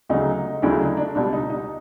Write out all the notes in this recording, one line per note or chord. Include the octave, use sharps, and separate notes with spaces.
D2 C#3 F#3 D#4
D2 C#3 F#3 D4 E4
D#4
D4
C#2 B2 G3 D4
D#4
D#4